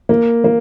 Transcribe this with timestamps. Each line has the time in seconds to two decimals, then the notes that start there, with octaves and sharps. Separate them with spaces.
0.09 A#3
0.44 A#3